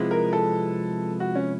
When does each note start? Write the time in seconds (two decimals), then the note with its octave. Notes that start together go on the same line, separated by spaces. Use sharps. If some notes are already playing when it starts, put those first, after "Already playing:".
Already playing: C3 F3 G#3 B3 E4
0.11 A#4
0.33 A4
1.20 F#4
1.35 C#4